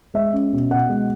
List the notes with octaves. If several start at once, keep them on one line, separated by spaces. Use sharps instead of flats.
G#3 E5
C#4
B2
B2 F#5
G#3